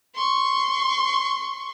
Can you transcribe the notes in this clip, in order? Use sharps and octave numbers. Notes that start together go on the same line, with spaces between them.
C6 C#6